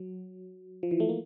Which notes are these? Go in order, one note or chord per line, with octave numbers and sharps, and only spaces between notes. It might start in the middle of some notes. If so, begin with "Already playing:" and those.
Already playing: F#3
F3
E3
A3
A#3